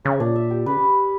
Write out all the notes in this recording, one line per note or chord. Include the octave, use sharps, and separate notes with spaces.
C#3 C#5
A#2 D4
E5
G4
C#3 B4